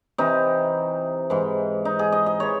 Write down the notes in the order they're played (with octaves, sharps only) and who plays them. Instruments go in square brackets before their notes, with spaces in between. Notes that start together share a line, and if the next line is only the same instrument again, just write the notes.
[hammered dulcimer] C3 E3 D#4
G#2 E3
D#4
G#4
D#5
D#5
E3 C#5